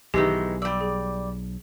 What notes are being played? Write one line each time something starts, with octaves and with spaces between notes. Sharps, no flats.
B1 D#3 E3 G#3 G4 A#6
G3 D5 E6
G#4